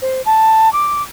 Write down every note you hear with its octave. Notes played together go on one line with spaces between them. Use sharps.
C5
A5
D6